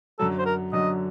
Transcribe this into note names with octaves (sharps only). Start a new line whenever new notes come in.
F#2 D3 F#3 A4
C5
A#4
F#2 D3 F#3 D#5